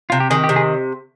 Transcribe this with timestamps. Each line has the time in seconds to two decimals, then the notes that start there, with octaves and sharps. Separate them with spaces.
0.10 C3 F4
0.20 G4
0.30 D#3 G#4
0.44 G4
0.49 C3
0.56 G#4